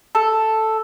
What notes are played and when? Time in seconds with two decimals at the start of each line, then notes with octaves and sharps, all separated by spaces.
0.15 A4